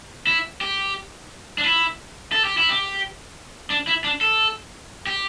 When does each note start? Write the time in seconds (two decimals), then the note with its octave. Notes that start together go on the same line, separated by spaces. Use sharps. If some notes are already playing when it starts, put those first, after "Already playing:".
0.27 E4
0.61 G4
1.58 D4
1.64 E4
2.32 A4
2.45 G4
2.58 E4
2.70 G4
3.70 D4
3.87 E4
4.04 D4
4.21 A4
5.07 G4